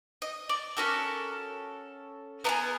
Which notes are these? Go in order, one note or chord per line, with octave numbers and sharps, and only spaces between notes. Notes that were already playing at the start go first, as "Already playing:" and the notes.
D#5
D5
C#4 F#4 A4 A#4
B3 E4 G#4 A#4